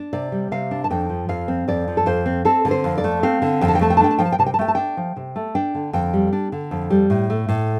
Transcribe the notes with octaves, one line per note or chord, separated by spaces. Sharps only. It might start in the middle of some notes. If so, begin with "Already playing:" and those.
Already playing: D4
C3 D5
G3
C3 F5
D4
A5
F2 G5
F3
F2 F5
C4
F2 D5
F3
A4
F2 C5
C4
C4 A4
D3
C5
F2
D5
A3
C4 F5
D3
F2 G5
A5
G5
A3 A5
G5
A5
D4 G5
A5
F3 G5
A5
G5
C3 A5
G5
A5
A3 G5
A5
D4 G5
F3
C3
A3
D4 G5
D3
F2 G5
G3
D4
D3
F2
G3
A2
A3
A2